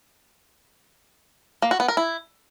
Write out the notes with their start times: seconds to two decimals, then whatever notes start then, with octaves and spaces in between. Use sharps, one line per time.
1.62 A#3
1.71 F#4
1.80 B3
1.88 A#4
1.97 E4